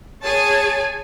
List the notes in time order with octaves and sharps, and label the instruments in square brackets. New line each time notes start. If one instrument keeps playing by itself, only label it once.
[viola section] G#4 C#5 G#5 A5